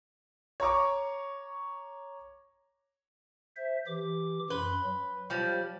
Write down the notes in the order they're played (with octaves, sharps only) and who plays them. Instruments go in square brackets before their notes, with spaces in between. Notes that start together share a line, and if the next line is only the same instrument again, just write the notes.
[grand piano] C#5 A#5 C#6 D6
[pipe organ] C5 E5
E3 G4 D6
[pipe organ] F#2 C6 [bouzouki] B4
[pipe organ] F#3
[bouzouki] F3 G3